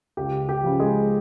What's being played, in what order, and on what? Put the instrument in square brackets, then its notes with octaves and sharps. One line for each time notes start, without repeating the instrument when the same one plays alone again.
[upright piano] C#2 G4
G4
C#3 F3
G#3 G#4